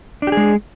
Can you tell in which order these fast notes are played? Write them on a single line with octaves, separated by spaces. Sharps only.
D4 G4 G#4 G#3